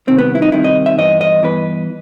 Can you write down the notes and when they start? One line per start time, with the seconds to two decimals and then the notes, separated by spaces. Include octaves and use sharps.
0.07 C2 C3 D#3 C4
0.18 B3
0.35 E4
0.42 D#4
0.52 C2 C3 D#3 E4
0.64 D#5
0.86 E5
0.98 G2 E3 B3 D#5
1.21 D#5
1.43 G2 E3 B3 B4